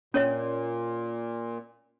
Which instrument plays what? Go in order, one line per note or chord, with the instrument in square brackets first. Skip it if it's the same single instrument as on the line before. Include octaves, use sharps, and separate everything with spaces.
[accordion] A#2 [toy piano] C#4 C#5 D#5